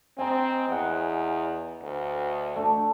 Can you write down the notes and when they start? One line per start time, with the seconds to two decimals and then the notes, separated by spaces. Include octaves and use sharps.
0.18 C4 D#4 G#5
0.69 E2 F#5 G#5
1.83 D2
2.56 A3 D4